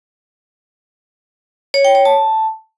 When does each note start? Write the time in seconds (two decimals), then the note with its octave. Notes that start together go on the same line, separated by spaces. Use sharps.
1.74 C#5
1.85 G5
1.95 C#5
2.05 A5